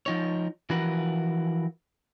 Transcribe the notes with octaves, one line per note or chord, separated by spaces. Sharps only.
F3 D#4 C#5
E3 F3 F#4 A#4 B4